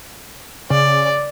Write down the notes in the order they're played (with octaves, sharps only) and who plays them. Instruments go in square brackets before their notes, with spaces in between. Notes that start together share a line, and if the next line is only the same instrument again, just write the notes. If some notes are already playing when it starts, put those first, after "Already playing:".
[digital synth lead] C#3 [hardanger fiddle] D5